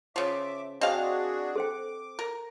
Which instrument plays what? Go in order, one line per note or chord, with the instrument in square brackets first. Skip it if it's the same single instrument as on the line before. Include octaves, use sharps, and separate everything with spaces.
[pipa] C#3 F3 [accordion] E5 D6
[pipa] C4 F5 [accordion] D4 F#4 G#4 [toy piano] D#5 A5
[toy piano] A4 C5 G5 [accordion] D6
[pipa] A#4